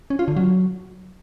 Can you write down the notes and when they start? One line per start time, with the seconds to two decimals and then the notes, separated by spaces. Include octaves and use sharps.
0.10 C#4
0.19 F4
0.28 D3
0.36 F#3